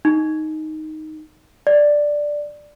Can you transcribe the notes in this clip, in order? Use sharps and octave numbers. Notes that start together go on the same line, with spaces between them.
D#4
D5